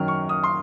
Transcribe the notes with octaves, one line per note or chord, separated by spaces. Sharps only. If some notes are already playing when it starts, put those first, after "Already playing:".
Already playing: F#2 D#3 F#3 F6
C#6
D#6
C6